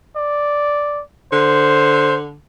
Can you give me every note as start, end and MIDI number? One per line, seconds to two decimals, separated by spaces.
0.16 1.02 74
1.32 2.35 50
1.32 2.16 72